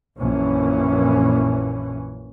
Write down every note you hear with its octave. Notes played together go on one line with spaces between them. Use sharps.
A#1 F#2 A#2 E3 C#4